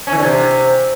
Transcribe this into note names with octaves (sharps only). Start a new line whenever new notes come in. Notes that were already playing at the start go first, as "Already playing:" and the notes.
C#4
E3
D3
C3